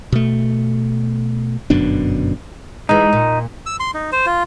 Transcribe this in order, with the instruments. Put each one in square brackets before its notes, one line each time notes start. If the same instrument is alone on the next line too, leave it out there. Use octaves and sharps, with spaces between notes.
[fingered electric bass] B2 A3
G1 F#2 B2 D4
[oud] E3 G#3 [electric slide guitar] D#4
[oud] A#2
[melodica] E6
C6
D#4
C5
F4